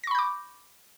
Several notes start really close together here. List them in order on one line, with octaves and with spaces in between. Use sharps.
A#6 C#6 B5 G6 D6